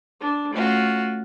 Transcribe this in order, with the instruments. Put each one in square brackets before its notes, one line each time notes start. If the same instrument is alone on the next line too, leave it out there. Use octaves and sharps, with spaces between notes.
[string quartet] D4
A3 C#4 F4 F#4